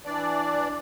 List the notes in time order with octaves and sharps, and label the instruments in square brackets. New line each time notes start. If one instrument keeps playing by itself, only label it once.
[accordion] E3 D4 D5